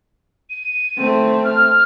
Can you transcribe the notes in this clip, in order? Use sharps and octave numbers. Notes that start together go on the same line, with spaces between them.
D#7
A3 C4
F6